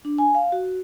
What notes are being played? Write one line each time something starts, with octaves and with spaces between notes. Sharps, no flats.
D4
G#5
F5
F#4